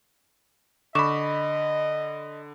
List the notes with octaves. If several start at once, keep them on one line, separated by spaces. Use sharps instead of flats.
D3 D#5 B5 C#6 D6 E7